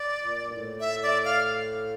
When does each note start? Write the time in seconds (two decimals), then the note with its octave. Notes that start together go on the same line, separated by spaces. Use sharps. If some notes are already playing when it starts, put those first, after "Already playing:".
Already playing: D5
0.22 A#2
0.44 G2
0.51 A2
0.80 E5
1.03 D5
1.25 F5